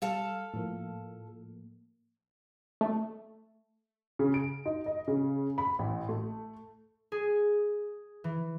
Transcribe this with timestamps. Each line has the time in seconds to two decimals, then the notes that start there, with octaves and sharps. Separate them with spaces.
0.02 G3 A4 F5
0.54 A2 F3 A#3
2.81 A3
4.19 C#3
4.34 D7
4.66 D#4
4.86 D#5
5.08 C#3
5.58 B5
5.79 A1
6.09 A3
7.12 G#4
8.24 E3